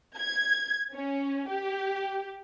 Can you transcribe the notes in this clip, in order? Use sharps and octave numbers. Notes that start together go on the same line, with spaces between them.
G#6
C#4
G4